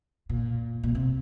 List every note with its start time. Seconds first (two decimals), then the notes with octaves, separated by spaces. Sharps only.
0.29 A#2
0.83 A#2
0.95 C3